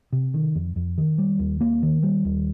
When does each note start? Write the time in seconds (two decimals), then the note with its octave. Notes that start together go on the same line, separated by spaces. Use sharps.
0.13 C3
0.34 D#3
0.55 F2
0.76 F2
0.98 D#3
1.18 G3
1.39 D#2
1.61 A#3
1.83 D#3
2.03 G3
2.25 D#2